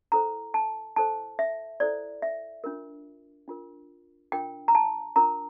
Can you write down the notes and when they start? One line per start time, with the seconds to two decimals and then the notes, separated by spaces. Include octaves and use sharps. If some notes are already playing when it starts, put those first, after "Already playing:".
0.12 E4 A4 C5 A#5
0.54 A5
0.96 E4 A4 C5 A5
1.39 E5
1.80 E4 A4 C5 D5
2.22 E5
2.64 D4 F4 A#4
3.48 D4 F4 A#4
4.32 D4 F4 A#4 G5
4.68 A#5
4.75 A5
5.16 D4 F4 A#4 A#5